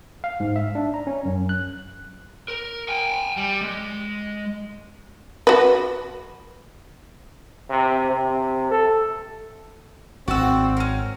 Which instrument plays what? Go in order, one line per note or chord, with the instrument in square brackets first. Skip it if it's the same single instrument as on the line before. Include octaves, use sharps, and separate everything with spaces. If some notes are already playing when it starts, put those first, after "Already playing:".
[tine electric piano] F5
G#2
E5
D4
A#5
C#4
F#2
F#6
[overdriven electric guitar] A#4
G5 G#5
G3
G#3
[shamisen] F#4 B4
[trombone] C3
C3
A4
[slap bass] G#1 [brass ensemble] C4 [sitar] F#4 [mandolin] D5 E6
[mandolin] C#4 A#4